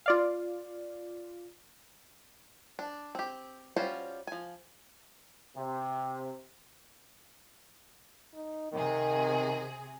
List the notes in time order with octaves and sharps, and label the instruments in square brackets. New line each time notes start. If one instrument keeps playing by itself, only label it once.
[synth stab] F4 D5 F5
[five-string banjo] D4
C4 G4
G3 C#4 F4 F#4 C5
F3 G#5
[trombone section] C3
[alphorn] D#4
[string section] C3 G#4 [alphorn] D#3